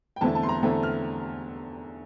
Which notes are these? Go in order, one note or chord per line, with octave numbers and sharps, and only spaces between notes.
G5
E2 D3 A3 C4 E4 A5
A5
C6
A#5
E2 D3 A3 C4 E4
F6